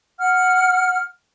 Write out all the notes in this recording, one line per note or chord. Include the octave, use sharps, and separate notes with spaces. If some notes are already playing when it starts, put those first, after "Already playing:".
F#5 F6